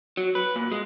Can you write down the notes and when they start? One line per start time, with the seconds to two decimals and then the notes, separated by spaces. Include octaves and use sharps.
0.17 F#3
0.35 B4
0.56 A#2
0.72 G#3